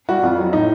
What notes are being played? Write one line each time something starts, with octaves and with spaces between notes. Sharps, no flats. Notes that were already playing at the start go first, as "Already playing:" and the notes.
G3 F#4
F2 F4
F#3
A2 D#4